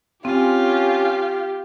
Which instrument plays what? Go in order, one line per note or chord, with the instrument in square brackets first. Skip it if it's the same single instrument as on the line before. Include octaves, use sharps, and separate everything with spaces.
[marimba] C4 [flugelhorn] C#4 [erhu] F4 [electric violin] G4